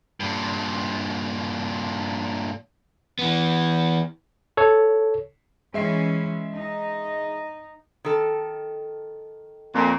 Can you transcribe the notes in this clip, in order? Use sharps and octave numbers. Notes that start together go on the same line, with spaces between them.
G2 A#2
E3 B3
A4 C#5
E3 G#3 C#4 E5 C7
D#4
D#3 A4
F2 A#2